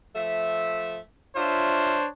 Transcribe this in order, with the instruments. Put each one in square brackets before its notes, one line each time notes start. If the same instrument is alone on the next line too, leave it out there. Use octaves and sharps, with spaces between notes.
[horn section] F3 A3 E5
[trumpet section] D4 C5 C#5 [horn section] F4 E5